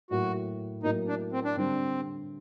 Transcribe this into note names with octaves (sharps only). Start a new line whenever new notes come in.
A2 F#3 A#3 F#4
A2 F#3 A#3 D#4
D4
C4
D4
D3 G3 C4 D4